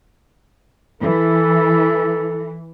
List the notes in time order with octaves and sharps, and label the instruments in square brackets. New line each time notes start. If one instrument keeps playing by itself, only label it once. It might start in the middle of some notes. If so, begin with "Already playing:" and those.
[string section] E3 [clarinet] A4